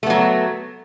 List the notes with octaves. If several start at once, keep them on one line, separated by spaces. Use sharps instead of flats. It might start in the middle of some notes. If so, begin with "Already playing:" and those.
F#3 A3 B3